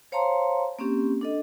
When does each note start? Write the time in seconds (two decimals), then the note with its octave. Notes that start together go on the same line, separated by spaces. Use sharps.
0.12 C5 C#5 F5 A5 A#5 C6
0.79 A#3 C4 C#4 G4
1.21 D4 A4 D#5